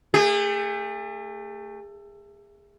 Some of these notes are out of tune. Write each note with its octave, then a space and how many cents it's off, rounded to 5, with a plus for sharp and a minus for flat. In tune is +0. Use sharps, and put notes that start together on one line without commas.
A3 +20 G#4 -35